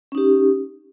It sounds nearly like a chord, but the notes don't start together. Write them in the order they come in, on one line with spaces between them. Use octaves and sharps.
C#4 D#4 G4